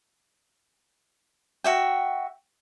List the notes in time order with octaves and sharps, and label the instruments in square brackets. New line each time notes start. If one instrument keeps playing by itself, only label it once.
[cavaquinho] F#4 E5 G5